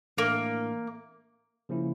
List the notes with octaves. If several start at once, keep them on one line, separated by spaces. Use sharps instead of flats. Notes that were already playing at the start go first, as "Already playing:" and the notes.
A2 E3 A3 A#3 D4
C#3 F3 A#3 C#4 E4